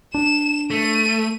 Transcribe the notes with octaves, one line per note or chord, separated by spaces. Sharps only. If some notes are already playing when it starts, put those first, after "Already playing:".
D4 E7
A3 D#7